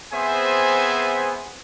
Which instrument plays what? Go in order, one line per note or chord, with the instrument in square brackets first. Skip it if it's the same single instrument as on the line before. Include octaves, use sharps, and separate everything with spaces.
[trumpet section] B3 C4 G#4 C5 E5 G#5